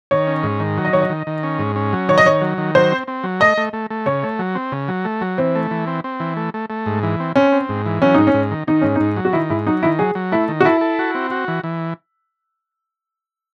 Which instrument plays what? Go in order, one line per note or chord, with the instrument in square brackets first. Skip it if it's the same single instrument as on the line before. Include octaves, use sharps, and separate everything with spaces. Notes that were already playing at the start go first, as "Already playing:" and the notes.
[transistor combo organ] D#3 [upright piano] C#5
[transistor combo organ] C#4
G#2
D#3
F#3
[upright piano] D#5
[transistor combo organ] D#3 [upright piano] C#5
[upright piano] D#5
[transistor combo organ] D#3
D#3
C#4
G#2
C#4
F#3
[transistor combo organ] D#3 [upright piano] C#5
[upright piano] D#5
[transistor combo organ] D#3 [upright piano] C#5
[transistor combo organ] F#3
D#3
[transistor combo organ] F#3 [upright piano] C5
[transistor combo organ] C4
C4
F#3
[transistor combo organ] A3 [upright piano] D#5
[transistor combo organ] A3
A3
A3
[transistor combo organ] C#3 [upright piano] C#5
[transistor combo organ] A3
F#3
C4
C#3
F#3
A3
F#3
[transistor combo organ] E3 [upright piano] C4
[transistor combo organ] A3
E3
C4
C4
E3
A3
A3
A3
G#2
E3
C4
[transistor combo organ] C4 [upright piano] C#4
[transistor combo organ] C4
G#2
E3
[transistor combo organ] F#3 [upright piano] C#4
[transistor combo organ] G#2 [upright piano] D#4
[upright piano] C#4
[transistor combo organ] G#2
D#3
[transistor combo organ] D#3 [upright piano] D#4
[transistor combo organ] G#2 [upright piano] C#4
[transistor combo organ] G#2 [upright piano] D#4
[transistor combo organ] F#3
[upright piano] F#4
[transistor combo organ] D#3 [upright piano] E4
[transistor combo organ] G#2 [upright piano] E4
[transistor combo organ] F#3 [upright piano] D#4
[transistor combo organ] D#3 [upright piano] E4
[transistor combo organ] F#3 [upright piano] G#4
[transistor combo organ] F#3
[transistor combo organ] A3 [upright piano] E4
[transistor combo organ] D#3
[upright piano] F#4
[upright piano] E4 [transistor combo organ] A4
[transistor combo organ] A4
F#4
C4
F#4
E3
E3